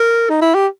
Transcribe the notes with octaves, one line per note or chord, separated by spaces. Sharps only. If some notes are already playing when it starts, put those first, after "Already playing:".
Already playing: A#4
D#4
E4
G4